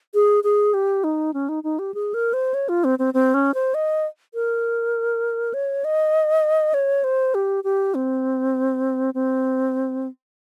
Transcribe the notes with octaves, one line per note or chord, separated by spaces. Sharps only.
G#4
G#4
G4
D#4
C#4
D#4
D#4
G4
G#4
A#4
C5
C#5
F4
C4
C4
C4
C#4
C5
D#5
A#4
C#5
D#5
C#5
C5
G4
G4
C4
C4